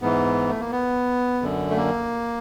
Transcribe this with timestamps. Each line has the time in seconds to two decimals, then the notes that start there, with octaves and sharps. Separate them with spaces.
0.02 G#2 E3 B3
0.49 A3
0.60 A#3
0.71 B3
1.42 F#2 D3
1.71 A3
1.77 A#3